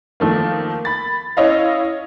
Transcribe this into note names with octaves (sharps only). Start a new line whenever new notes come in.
D#3 F3 A3 A#3
B5 A6
C#4 E4 C#5 D#5 F5